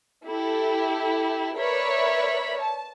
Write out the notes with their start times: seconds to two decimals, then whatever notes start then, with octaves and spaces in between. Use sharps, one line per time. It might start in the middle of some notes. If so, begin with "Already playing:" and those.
0.25 E4 G4 A4
1.58 A#4 B4 C#5 D5 E5 B5
2.60 A5